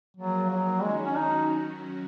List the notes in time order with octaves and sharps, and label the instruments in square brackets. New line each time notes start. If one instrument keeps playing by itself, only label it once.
[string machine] F3 A#3 F4 G#4 [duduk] F#3
[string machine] F3 A#3 D#4 G#4 [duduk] F#3
[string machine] D#3 F#3 C#4 F#4 [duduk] G#3
[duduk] C#4
D#4